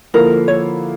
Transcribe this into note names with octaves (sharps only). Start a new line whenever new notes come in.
D3 F3 A#3 E4 A#4
C#5